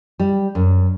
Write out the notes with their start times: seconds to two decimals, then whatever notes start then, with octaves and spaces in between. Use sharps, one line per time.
0.19 G3
0.55 F#2